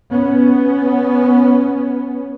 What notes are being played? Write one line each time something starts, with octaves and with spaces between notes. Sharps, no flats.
B3 C#4